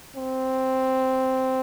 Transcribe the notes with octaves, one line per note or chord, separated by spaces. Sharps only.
C4